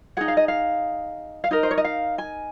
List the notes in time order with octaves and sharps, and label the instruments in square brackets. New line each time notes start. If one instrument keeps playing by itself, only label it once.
[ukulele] D#4 G#4 F#5
F5
D#5
F5
F5
D#4 A#4 D#5
C5
C#5
D#5
F5
G#5